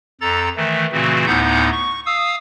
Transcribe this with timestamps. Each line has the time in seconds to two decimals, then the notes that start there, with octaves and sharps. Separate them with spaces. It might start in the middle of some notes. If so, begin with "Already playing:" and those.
0.21 F2 A4 A#5 A6
0.57 D#3 E3 A3
0.92 A#2 C#3 E3 A3 C4 F#4
1.26 D2 A2 B3 D#4 F#5 G6
1.72 C#6
2.06 F5 D#6 E6